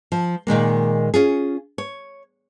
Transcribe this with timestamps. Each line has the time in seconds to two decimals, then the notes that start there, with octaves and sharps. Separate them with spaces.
0.12 F3
0.47 A#2 D#3 G#3 A#3
1.14 C#4 F4 G#4
1.78 C#5